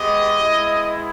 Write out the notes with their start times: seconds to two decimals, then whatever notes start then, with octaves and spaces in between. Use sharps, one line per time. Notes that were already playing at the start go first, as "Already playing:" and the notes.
Already playing: G#3 B3 G4 D#5
0.37 G#3 B3 E4